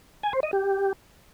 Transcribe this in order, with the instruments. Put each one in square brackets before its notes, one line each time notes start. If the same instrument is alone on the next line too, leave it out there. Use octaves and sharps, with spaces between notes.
[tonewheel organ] G#5
C5
D#5
G4